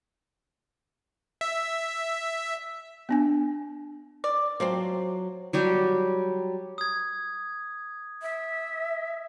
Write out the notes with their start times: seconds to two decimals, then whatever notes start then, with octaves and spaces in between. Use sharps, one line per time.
1.41 E5
3.09 B3 D4 G#5
4.24 D5
4.60 F3 F#3 C4 C5 D5
5.53 F#3 G3 G4
6.78 D#6 G#6
8.22 E5